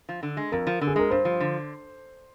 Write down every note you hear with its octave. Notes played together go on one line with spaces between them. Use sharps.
F3
D3
G#3
F2 A#4
F3
D3
G#4
G#3 A#4
G2 C5
F3
D3